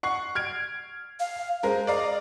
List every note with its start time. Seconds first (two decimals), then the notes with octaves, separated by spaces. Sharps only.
0.03 F#5 C#6 C7
0.35 F6 G#6 D7
1.20 F5
1.63 G#3 A#4 C5
1.87 D5 D#5 F5 A#5